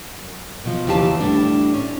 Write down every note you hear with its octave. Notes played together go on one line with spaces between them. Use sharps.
F#2
B2 F3
D#2 C#3 E3 G4 F5 A5
A2 G3 D4
C#4